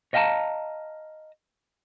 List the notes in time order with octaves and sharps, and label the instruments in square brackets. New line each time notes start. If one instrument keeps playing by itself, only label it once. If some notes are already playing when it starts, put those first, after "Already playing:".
[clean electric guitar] C#5 D#5 F5 G5 A5 A#5